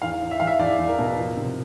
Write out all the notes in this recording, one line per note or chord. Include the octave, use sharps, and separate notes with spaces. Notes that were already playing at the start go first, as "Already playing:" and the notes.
E2 F5
E2
E5
E2 F5
E5
E2 D5
E2
A#4
B2
F3
C3